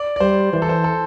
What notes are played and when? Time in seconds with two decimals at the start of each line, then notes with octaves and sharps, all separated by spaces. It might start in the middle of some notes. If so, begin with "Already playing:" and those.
Already playing: D5
0.16 D5
0.20 G3 C5
0.53 E3 C5
0.62 A4
0.69 C5
0.84 A4